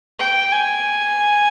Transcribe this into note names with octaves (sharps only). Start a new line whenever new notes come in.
G5
G#5